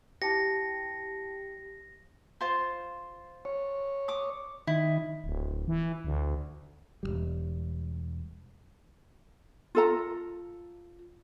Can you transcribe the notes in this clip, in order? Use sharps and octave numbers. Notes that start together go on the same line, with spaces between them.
E4 G4 A5 A#6 C#7
F4 C5
C#5
D6 D#6
D#3 E4
D1
E3
D2
E1 D#2 G3
F4 A4 A#5